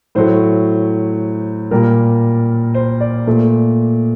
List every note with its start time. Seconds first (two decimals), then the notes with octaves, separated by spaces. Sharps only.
0.15 A2 F#3 A3 C5
1.71 A#2 G3 A#4
2.74 C5
3.00 D5
3.27 A#2 A3